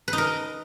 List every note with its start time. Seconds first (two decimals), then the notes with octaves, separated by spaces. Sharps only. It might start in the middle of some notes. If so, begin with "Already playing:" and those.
0.08 B4
0.13 D#4
0.18 A#4